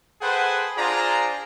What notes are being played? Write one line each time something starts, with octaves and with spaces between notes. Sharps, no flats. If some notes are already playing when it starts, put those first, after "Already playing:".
G#4 A4 B4 C5 F#5 G5
D4 F4 G#4 C5 D5 A#5